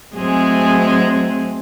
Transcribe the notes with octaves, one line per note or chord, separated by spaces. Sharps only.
F#3 G#3 A3 C4 G#4